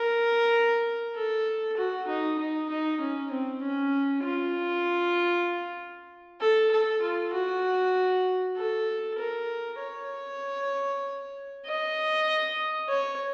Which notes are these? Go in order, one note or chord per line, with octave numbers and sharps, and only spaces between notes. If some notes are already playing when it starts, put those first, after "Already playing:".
Already playing: A#4
A4
F#4
D#4
D#4
D#4
C#4
C4
C#4
F4
A4
A4
F4
F#4
A4
A#4
C#5
D#5
C#5